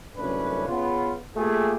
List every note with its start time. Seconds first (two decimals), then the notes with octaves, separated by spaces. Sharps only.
0.18 C2 F#2 A3 C#4 D4 B4
0.67 C#3 B3 F4
1.35 A3 A#3 F4 G4 G#4